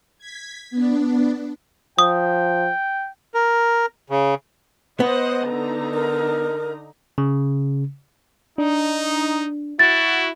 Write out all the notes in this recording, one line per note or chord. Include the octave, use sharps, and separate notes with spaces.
G#6 B6
B3 D4
F3 G5 D#6
A#4
C#3
B3 C5 D#5 F#5
D3 D#4 A#5
A#4
C#3
D4 D#4
E4 F#4 A6